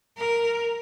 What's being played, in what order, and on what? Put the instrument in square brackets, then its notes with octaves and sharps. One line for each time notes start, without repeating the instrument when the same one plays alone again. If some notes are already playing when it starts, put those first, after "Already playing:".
[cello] A#4